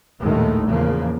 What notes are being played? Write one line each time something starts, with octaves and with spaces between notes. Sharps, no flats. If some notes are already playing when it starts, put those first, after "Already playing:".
A#1 D#2 A2 D#3 G#3 A3
E2 C#3 F3 A#3